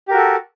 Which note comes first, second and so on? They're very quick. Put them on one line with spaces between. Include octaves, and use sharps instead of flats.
G4 A#4 F#4 A4